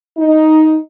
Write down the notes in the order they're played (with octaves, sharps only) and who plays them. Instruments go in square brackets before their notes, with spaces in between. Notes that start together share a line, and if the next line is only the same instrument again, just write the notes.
[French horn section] D#4